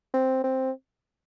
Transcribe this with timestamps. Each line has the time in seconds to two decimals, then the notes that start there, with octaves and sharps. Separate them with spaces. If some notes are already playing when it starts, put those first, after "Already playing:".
0.14 C4
0.44 C4